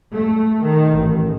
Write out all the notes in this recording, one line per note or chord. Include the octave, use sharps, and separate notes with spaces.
A3
D#3
A1